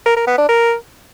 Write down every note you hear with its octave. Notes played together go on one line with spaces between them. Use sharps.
A#4
A#4
B3
D4
A#4